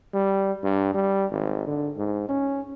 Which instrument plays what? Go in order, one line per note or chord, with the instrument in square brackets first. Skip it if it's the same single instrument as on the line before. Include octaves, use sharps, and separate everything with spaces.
[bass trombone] G3
G2
G3
G#1
D3
G#2
C#4